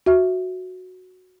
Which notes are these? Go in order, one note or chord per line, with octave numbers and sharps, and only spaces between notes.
F#4 E5